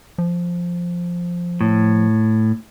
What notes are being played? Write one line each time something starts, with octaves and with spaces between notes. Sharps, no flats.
F3
A2